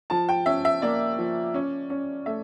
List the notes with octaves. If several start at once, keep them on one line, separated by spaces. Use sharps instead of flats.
F3 A5
G5
C#4 E5
E5
A#3 D5
F3
C#4
C#4
A3 E5